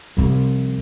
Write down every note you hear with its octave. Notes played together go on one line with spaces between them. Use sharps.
C2 F3